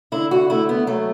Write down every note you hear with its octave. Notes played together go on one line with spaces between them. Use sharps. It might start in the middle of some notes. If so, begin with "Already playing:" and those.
D3 E4
F#4
A3 E4
B3
F#3 A3